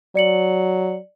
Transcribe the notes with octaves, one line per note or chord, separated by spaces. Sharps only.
F#3 D5 C#7 F#7